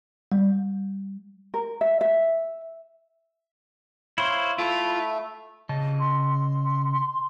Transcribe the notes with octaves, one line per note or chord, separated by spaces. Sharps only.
G3
A#4
E5
E5
E4 C5 C#5 F5
A3 E4 F4 E5
C#3 D#5 A5
C6